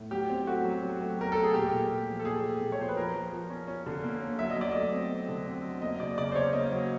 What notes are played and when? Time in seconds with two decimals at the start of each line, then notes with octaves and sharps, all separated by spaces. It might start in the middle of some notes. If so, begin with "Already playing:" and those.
Already playing: A2
0.11 F#3 G4
0.30 C4
0.47 A3 F#4
0.65 F#3
0.83 F#3
1.00 A3
1.18 A3 A#4
1.32 A3 A4
1.43 G#4
1.54 A#2 G4
1.71 A#2
1.89 A3
2.07 F3
2.19 A4
2.25 A#2 G#4
2.43 A3
2.61 A#2
2.72 C#5
2.79 F3 C5
2.89 B4
2.97 F3 A#4
3.14 F3
3.33 F3
3.50 C#4
3.68 C#4
3.86 D3
4.03 A#3
4.21 C#4
4.39 F#3 E5
4.50 D#5
4.57 F#3 D5
4.72 A3 D#5
4.93 C4
5.10 C4
5.28 D3
5.46 C4
5.64 F#3
5.82 A#3 D#5
6.00 C#3 D5
6.17 C#3 D5
6.32 C5
6.35 C#4 C#5
6.53 A#3 D#5
6.71 F#3